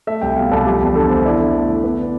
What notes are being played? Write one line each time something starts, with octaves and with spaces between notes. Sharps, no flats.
A3 E5
C2 G5
B2 F5
C2 A4
F3 G4
E2
D3 A4
E2 C5
E4 D5
D3
A3
D3
B3